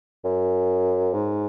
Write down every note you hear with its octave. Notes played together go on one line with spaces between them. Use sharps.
F#2
G#2